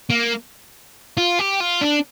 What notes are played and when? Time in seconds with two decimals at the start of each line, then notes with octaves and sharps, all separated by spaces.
0.10 A#3
1.17 F4
1.39 G4
1.60 F4
1.81 D4